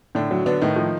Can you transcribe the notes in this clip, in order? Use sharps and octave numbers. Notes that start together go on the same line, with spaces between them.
A2 D3 D4
F#3
D3 B3 D4
A2 D#3 D#4
F3